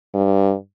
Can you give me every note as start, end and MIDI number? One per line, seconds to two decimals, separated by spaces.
0.14 0.54 43